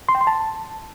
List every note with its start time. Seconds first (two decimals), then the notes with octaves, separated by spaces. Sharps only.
0.09 C6
0.15 G5
0.21 C6
0.27 A5